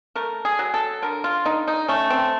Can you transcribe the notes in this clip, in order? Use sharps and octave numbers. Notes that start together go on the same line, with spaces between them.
A3 A#4
G#4
F#3
A4
D3 A#4
F4
D3 D#4
D#4
A3 C#4
C4